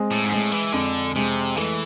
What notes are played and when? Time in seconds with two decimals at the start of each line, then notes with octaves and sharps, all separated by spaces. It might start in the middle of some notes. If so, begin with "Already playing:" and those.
Already playing: G#3 C4
0.11 A2
0.24 G#2
0.32 A2 G#3
0.52 E3
0.73 F2 D3
1.15 C3 G#3
1.57 E3 A3